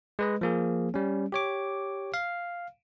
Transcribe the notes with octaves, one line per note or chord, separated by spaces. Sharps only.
G#3 B4 D#5
F3 A#3 G#4
G3 C#4
G4 C#5 D6
F5